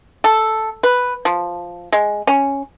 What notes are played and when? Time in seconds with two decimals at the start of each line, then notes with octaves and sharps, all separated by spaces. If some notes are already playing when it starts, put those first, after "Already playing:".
0.24 A4
0.83 B4
1.25 F3
1.92 G#3
2.27 C#4